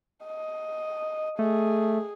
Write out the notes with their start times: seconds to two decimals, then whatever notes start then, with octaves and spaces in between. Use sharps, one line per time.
0.25 D#5
1.39 A3 G#4